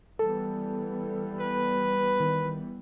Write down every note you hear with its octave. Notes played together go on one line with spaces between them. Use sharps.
E3 G3 B3 A4
B4
D#3